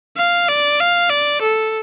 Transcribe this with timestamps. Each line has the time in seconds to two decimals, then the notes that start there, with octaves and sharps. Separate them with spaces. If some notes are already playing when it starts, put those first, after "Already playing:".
0.17 F5
0.48 D5
0.80 F5
1.10 D5
1.42 A4